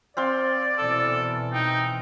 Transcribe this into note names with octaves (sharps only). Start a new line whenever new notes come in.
C4 D5 F5 C6
B2 E3 A4
D#4 G5